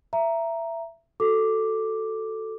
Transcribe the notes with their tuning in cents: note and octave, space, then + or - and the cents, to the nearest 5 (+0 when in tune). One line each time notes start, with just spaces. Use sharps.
E5 +20 A#5 +0
F#4 +0 A4 +0 D6 +0